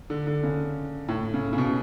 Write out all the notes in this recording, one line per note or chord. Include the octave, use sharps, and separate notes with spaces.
D3
D3
C#3
A2
C#3
C#3
B2